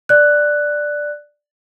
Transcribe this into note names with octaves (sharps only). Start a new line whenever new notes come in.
D5 F#6